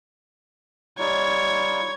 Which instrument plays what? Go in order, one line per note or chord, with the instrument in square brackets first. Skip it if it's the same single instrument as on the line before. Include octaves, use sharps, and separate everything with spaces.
[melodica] G3 D#4 F4 [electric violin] C#5 G#6